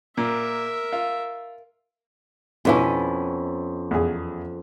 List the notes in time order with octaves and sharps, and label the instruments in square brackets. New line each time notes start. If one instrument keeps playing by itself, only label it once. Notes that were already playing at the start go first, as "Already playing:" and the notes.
[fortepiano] A#2 [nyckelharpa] A#4 E5
[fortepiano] F4
[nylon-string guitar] F2 B3 C#4 [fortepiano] B2 D4 E4
[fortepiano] E2 G#4